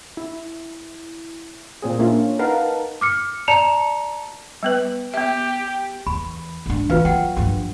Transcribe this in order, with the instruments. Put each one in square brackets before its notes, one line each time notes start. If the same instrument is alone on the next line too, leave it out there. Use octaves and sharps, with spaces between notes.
[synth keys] E4
A#2 C4 G#4
A#3 C#4 D4 E4 F4
D#4 A#4 B4 F5 F#5 A5
[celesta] D6 F6 C#7
D5 A5 A#5 C#7 E7 F7
[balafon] G3 B3 B4
[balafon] B3 E5 [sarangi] G4
[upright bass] E2 [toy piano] B5
[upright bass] G#1 D4
[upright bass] E3 [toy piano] F4 B4 F5
[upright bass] F#3 [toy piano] F#5 G5
[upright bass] G2 F3